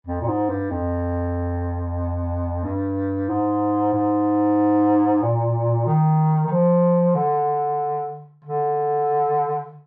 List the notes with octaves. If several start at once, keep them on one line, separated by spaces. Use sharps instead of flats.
F2
A#2
G#2
G2
F2
G2
G#2
G#2
A#2
D#3
D#3
F3
D3
D3